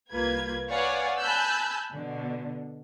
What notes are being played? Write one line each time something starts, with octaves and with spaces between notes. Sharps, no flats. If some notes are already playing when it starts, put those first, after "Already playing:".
C2 A#3 F4 B4 G#6
B4 C#5 D5 F5 F#5 G#5
G#5 A5 B5 E6 F#6 G6
B2 D3